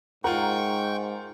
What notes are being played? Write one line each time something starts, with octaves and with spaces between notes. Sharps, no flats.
G#2 F4 A#4 F#5 G5 A#5 C#6